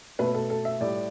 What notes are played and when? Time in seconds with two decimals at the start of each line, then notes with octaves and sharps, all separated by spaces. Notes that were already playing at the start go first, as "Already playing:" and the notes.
0.19 B2 A3 B4
0.34 A4
0.50 A4
0.65 E5
0.81 A2 G3 D5